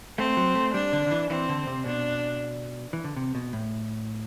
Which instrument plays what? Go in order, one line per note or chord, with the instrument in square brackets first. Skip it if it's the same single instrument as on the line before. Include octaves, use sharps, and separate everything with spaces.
[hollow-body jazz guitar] A3 [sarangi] C4
[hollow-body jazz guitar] F#3
A3
[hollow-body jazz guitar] G3 [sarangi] D4
[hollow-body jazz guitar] D3
D3
E3
[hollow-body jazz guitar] E3 [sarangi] C4
[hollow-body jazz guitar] D3
C3
[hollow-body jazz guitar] B2 [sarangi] D4
[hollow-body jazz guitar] E3
D3
C3
B2
A2